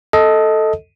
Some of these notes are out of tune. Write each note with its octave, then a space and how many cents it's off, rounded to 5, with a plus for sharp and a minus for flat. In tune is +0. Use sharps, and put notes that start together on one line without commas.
A4 +0 D#5 +15